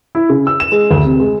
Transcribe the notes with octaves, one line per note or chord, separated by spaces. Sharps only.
E4
C#3
E6
E7
G#3
D2
C3
G#3